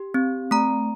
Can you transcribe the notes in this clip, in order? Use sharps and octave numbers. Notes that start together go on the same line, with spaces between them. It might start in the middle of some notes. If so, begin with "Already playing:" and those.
Already playing: G4
C4
A3 A#5